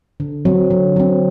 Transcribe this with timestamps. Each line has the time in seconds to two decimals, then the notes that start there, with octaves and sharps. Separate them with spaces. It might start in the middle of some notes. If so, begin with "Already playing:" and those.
0.20 D3
0.45 F#3 C4
0.70 D3
0.96 F#3 C4